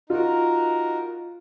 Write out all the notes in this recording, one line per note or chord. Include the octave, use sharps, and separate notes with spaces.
D#4 F4 F#4 A#4